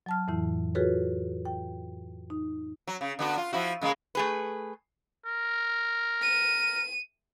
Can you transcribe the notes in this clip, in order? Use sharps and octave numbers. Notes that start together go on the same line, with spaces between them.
F#3 A5 F6
F2 A2 E3 E4
F4 F#4 G#4 A4 B4 C#5
G5
D#4
F#3
C#3
D3 B3 F#4
F4
F3 E4 F#4
C#3 G#3 A#3
A3 G#4 B4
A#4
D#7